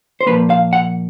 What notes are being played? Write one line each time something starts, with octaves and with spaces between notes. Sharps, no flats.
C5
A#2 F3 A#3 B4
F5
F#5